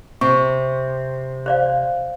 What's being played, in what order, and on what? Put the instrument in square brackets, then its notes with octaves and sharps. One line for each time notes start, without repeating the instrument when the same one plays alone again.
[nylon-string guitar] C3 [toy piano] C#6
[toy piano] C5 D5 F5